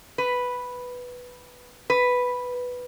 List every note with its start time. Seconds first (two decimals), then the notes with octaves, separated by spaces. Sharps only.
0.18 B4
1.90 B4